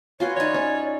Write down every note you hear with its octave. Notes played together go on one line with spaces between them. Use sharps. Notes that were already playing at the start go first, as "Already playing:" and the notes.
C#4 F4 F#4 B4 C#5 C6
E2 D#4 C#5 D5
C#4